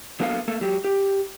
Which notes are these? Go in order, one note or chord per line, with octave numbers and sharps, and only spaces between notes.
F#3 A#3 B3 D4 A4 F5
A3 A#3 A4
F#3 G4
G4